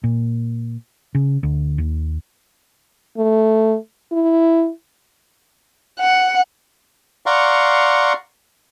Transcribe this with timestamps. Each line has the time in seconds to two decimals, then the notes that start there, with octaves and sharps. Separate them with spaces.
0.04 A#2
1.15 C#3
1.43 D2
1.78 D#2
3.17 A3
4.12 E4
6.00 F#5
7.26 D5 F5 F#5 A#5 C6 C#6